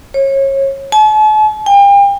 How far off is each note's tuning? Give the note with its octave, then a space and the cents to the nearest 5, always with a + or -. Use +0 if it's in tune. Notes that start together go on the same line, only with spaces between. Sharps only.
C#5 -30
A5 -45
G5 +40